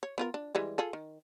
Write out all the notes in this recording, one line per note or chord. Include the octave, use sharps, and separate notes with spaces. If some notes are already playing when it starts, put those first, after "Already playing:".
C#5
B3 F4 A#4
D4
E3 G3 G#3
F4 G#4 A4
D#3